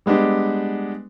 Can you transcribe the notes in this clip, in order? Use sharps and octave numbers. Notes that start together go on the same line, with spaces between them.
G3 G#3 B3 D4 G4